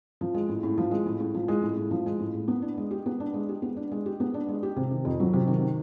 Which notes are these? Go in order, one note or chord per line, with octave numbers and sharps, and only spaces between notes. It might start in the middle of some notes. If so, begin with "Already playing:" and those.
F3
G#3
A2
A2
F3
G#3
A2
A2
F3
G#3
A2
A2
F3
G#3
A2
A2
B3
D4
G#3
G4
B3
D4
G#3
G4
B3
D4
G#3
G4
B3
D4
G#3
G4
C3
D#3
F2
F#3
C3
D#3